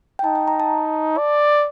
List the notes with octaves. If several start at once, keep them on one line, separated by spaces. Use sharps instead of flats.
G5
D#4 A5
G5
A#5
A5
D5